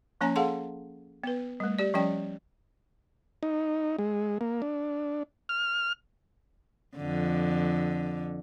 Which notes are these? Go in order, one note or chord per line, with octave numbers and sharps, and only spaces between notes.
F3 A#3 C#4 C#5 G#5 A#5
G#4 A4 F5 F#5 A5 C6
B3 B4
G3 A3
G4 D5
F3 G3 C#4 D5 G5
D#4
G#3
A#3
D4
F6
F2 D3